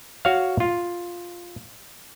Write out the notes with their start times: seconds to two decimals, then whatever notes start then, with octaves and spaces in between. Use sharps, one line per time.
0.25 F#4 C#5 F5
0.60 F4